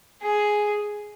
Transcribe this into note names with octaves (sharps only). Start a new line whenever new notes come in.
G#4